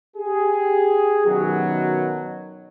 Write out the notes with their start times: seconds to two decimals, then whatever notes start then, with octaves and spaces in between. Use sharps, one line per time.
0.16 G4 G#4
1.25 F#2 B2 D#3 F#3